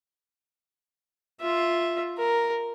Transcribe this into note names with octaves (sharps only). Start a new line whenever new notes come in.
F4 E5
A#4